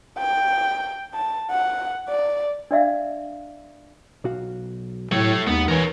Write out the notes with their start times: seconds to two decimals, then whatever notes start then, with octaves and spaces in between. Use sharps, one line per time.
0.18 G5
1.14 A5
1.51 F#5
2.09 D5
2.71 D4 D5 E5 F5
4.24 B1 F#4 F5
5.12 A2 C3 F#3 A3 C#5
5.47 D#2 G#3 B3 D#4
5.68 E3 A#4 C#5